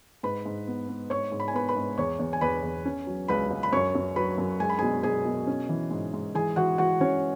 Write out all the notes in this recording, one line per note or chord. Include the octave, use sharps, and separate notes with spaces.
G#2 B4 B5
G#2
B3
B3
G#2 C#5 C#6
G#2
B5
G#5
B3 B4 B5
B4 B5
G#2
E2 C#5 C#6
E2
G#5
E2 B4 B5
E2
C#4
F#3
C#2 B4 B5
C#2
B5
F#2 C#5 C#6
F#2
F#3 B4 B5
F#2
G#3 G#5
B5
B2 G#4 G#5
B2 G#4 G#5
B2
C#4
E3
G#2
G#2
E3 G#4 G#5
E3 F#4 F#5
E3 F#4 F#5
E3 C#4 C#5